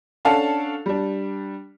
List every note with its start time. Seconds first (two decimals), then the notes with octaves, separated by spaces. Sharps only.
0.25 C#4 D4 A4 F5 F#5 A5
0.86 G3 D4